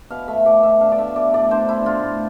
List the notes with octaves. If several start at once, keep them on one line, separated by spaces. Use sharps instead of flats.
B2 F5
A3 E5
B2 D5
B2 E5
D4 F5
D5
A3 E5
B2 D5
A2 D5
D4 C5
D4 E4
A2 F4
A2